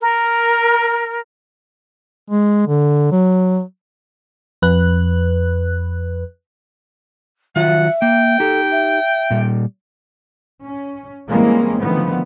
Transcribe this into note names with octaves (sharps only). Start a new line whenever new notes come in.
A#4
G#3
D3
F#3
F2 B4 F#6
D#3 F#3 F4 E5 F#5
A#3 G5
D#4 G4 A4
E5
A#2 G3
C#4
E3 G3 G#3 A#3 C4 C#4
D3 D#3 F3 A3 B3